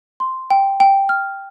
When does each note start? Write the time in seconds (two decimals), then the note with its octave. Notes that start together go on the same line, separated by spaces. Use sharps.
0.20 C6
0.50 G5
0.80 G5
1.09 F6